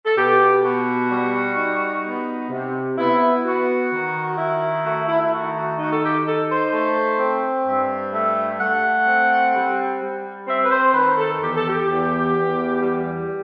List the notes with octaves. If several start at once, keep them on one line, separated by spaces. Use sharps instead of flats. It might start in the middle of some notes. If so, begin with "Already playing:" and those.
A4
B2 G4
B2 F#4
G3
D#4
B3
C3
B3 E4
B3 F#4
D#3
E4
A3 F#4
E4
E4
D#3 F#4
F#4
D#4 F#4
A4
G4
D#4 A4
C5
A3
C4
G2 E5
A3 E5
A3 F#5
C4
G3
G3
C4 E5
B4
C5
D#3 B4
A4
E2 G4
A4
G4
E2
E2
G3